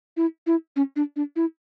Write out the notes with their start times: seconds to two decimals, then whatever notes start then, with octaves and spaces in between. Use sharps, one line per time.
0.17 E4
0.47 E4
0.76 C#4
0.96 D4
1.16 D4
1.36 E4